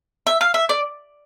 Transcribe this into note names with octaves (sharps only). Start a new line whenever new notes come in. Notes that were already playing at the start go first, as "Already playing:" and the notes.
E5
F5
E5
D5